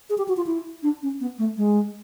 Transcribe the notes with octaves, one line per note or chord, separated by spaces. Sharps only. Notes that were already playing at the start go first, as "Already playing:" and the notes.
G#4
G4
F#4
F4
E4
D4
C#4
B3
A3
G#3